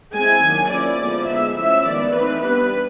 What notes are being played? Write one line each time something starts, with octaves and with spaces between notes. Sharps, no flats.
G#3 C4 E4 G#5
D#3 F#3 A#3 D4
F3 A#3 C#4 E4 D5
D3 F3 G#3 B3 E4
G#3 B3 D#4 E5
F3 A3 C#4 E4 E5
D#3 G#3 B3 D5
E3 A3 C4 D#4 B4
G3 B3 D4 B4